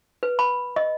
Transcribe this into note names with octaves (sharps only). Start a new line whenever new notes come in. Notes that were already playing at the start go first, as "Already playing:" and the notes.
B4
B5
D#5